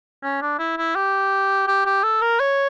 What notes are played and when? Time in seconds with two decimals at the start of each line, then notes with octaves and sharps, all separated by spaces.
0.23 C#4
0.42 D4
0.59 E4
0.77 E4
0.95 G4
1.67 G4
1.85 G4
2.03 A4
2.21 A#4
2.40 C#5